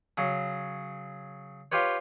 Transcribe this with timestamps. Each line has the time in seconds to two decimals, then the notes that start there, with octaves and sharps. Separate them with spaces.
0.18 C#3 F#3
1.72 F4 G4 B4 C#5